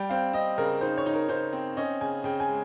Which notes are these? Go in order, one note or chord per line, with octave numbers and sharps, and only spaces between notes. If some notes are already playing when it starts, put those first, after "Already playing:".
Already playing: G3 G5
C4 F5
C4 D#5
C#3 A#4
D#4 C5
C#5
D#4
A#4
D#4 C5
C4
C#4 D#5
C#3 G#5
C#3 G5
G#5
G#3